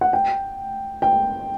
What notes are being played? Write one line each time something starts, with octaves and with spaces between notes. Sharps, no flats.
F#5
G5
G5